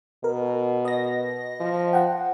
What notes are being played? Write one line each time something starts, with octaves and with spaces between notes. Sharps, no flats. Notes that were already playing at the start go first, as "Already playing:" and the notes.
B2 A#4
D#5 A#6
F3
F#5 G5